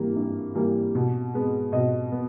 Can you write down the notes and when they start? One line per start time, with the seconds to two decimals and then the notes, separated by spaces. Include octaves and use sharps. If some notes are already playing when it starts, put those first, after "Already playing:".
Already playing: G2 E3 G3 A#3
0.16 G2
0.55 E3 G3 A#3
0.95 B2
1.34 G#3 B3
1.72 B2 D#5
2.12 B3